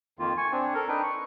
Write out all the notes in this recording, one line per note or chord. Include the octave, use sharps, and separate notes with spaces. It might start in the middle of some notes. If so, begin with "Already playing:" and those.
F2 D#3 A#3 F4
G#5 C#6
C4 D4
A4 A#4
D4 D#4 B4 G5
C#6